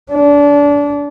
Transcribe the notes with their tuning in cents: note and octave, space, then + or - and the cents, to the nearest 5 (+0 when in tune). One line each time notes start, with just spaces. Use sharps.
D4 -25